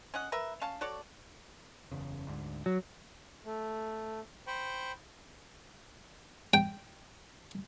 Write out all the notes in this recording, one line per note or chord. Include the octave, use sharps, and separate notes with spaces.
C#4 D#5 F#5
A#4 B4 E5
C#4 F5 A5
F#4 A4 C#5 D5
F#1 E2 C#3
D2 G#2 D3
F#3
A3
C5 G5 B5 C#6
G5